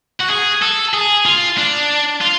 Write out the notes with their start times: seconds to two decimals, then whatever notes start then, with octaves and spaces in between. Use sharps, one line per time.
0.21 F#4
0.30 G#4
0.62 A4
0.94 G#4
1.26 F4
1.58 D4
2.21 F4